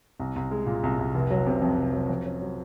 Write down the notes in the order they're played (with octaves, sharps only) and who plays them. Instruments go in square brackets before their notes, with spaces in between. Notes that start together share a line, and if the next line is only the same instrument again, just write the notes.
[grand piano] C2
C2
G#3
A#2
C2
C2
F1
F#3
C3
F2
F1
F#3
F2
C#4
F#3